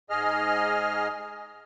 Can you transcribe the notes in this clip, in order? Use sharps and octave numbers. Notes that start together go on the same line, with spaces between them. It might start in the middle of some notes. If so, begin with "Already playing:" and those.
G#2 G#4 D#5 F6